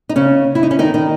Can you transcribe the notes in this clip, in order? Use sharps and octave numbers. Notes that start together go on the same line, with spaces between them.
D#4
C#3 C#4
E4
D#4
C#4
D#3 D#4
D#3 D#4